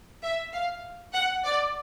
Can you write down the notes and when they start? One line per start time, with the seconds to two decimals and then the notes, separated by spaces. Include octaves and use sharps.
0.23 E5
0.53 F5
1.14 F#5
1.44 D5